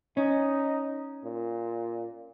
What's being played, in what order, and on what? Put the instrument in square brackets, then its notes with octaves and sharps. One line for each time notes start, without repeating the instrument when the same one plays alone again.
[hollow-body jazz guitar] C#4 [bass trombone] D#4
[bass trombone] A#2